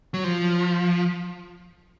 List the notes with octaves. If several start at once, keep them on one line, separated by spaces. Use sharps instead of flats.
F#3
F3